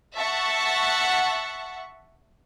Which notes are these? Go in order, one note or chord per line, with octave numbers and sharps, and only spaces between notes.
E5 F#5 A5 C#6